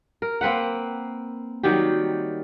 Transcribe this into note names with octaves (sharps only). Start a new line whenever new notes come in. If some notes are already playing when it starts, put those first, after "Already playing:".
A#4
A#3 C4 B4 F#5
D#3 F#3 G3 G4